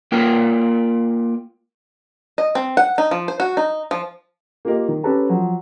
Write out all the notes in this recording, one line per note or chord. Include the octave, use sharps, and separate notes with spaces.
A#3 F4 A#4 G5
D#5
C4
F#5
D#4
F3
C5
F#4
D#4
F3
A#3 F4 G4 A#4 D#5
D#3
C#4 G4 A4 B4 A5 A#5
F3 F#3